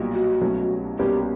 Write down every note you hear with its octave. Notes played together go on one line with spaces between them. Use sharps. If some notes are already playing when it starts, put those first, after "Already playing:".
Already playing: B1 A#2 G3
F#4
C2 B2 F#3 A3 C#4
C2 B2 G3 A#3 C#4 G4